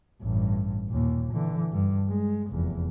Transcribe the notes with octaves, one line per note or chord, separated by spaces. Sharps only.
A1 G2
D#2 A#2
D3 E3
G2
G#3
F1 E2